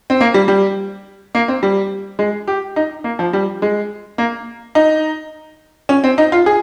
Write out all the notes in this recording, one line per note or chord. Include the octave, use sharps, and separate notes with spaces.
C4
A#3
G3
G3
A#3
C4
G3
G#3
G4
D#4
A#3
F3
G3
G#3
A#3
D#4
C#4
C4
D#4
F4
G#4